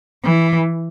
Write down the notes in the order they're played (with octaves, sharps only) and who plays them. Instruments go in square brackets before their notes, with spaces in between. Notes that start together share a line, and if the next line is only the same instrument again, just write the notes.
[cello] E3